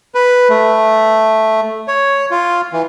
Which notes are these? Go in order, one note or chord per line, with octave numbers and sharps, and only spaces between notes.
B4
A3
C#5
F4
E3